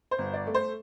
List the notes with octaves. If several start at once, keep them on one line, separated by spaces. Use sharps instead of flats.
C5
G1
D5
A3
C5